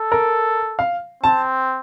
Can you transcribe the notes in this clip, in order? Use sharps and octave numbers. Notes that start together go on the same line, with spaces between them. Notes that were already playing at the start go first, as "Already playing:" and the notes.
Already playing: A4
A#4
F5
C4 A5